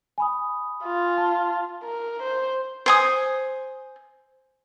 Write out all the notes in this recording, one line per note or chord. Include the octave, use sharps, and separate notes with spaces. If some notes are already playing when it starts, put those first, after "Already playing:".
G#5 B5 D#6
F4
A5
A#4
C5
C5 G#5 D#6